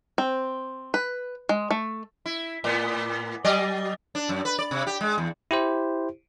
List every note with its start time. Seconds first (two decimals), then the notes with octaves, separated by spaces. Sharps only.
0.18 C4
0.94 B4
1.49 G#3
1.71 A3
2.26 E4
2.64 A2 B3
3.45 F#3 D5 D#5
4.15 D4
4.29 F#2
4.45 B4
4.59 D5
4.71 C3
4.87 G4
5.01 G#3
5.18 E2
5.51 E4 G4 C5